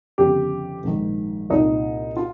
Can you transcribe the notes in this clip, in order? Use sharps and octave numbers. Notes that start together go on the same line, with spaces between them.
G1 F2 C#3 G4
A#1 G#2 D#3
C2 A#2 D#4
F4